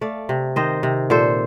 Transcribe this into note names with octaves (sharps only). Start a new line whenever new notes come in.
A3 D5 F5
C3
D#3 C5 D#5
C3
A#2 A4 C5